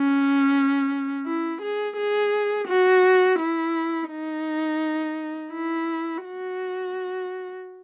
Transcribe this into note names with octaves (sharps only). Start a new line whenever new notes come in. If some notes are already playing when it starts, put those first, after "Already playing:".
Already playing: C#4
E4
G#4
G#4
F#4
E4
D#4
E4
F#4